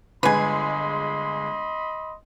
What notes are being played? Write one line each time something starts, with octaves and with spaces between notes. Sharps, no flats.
G1 G#3 B4 D#5 G#5 B5 C6